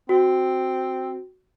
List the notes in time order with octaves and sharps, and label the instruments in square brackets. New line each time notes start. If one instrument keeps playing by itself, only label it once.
[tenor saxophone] C4 [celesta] F#4